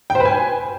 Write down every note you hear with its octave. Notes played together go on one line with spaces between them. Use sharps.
G5
C5
B4
G#5